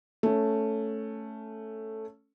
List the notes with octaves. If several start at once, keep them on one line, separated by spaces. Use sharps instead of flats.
A3 C#4